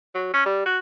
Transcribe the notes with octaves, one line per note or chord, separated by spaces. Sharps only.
F#3
C#4
G3
F#4